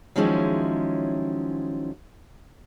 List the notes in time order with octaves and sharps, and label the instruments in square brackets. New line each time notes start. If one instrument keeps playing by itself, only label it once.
[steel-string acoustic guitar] D#3 F3 F#3 G#3 C#4 E4